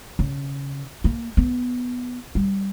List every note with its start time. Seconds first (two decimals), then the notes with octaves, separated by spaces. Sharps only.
0.19 C#3
1.04 A#3
1.37 B3
2.35 G3